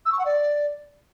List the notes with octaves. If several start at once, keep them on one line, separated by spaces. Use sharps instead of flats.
E6
C#6
F#5
D5